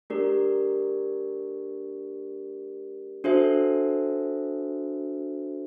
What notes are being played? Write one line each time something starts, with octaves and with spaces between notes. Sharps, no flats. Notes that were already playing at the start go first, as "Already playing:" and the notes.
A3 D4 G4 A#4 D5
D4 F#4 A4 C5 E5